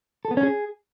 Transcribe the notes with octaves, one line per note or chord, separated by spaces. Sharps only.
A4
B3
C#4
G#4